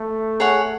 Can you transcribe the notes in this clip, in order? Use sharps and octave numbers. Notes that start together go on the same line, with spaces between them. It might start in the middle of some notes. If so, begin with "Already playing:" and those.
Already playing: A3
G#4 C#5 F#5